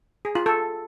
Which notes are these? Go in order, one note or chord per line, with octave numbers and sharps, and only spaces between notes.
G#4
F4
A4